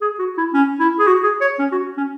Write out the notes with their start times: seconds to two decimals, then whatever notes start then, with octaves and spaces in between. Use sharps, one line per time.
0.02 G#4
0.19 F#4
0.38 E4
0.54 C#4
0.80 E4
0.99 G#4
1.07 F#4
1.23 G#4
1.41 C#5
1.59 C#4
1.72 F#4
1.97 C#4